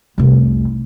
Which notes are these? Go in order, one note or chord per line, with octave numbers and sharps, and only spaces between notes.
F1 C2